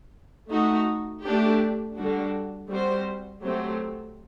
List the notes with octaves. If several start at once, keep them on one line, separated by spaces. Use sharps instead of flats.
A3 D#4 F#4
A3 D4 G4 D5
D3 G3 D4 F#4
G3 C4 F#4 C5
F#3 A3 C4 G4